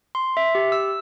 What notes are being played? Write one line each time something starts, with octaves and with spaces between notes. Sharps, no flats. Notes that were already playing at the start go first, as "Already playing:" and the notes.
C6
E5
G4
E6